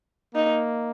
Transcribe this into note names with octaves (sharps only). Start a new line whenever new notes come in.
A#3 D#4